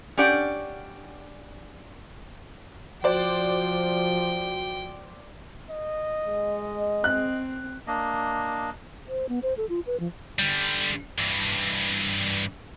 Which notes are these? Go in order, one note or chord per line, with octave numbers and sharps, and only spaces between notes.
C#4 D4 G4 D5 F#5
F3 F#4 C5 D5 G5
D#5
G#3
C4 F#6
A#3 D4 D#5
C5
B3
C5
A4
F4
B4
F3
D3 G3
G2 E3